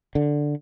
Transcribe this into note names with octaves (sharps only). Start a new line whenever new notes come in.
D3